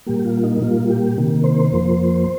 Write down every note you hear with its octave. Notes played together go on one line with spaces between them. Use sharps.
A#2 G3 A#3 G4
G4
F4
D#4
A#2 G3 A#3 F4
G4
C3 D#3 A#3
C5
F2 F3 A#3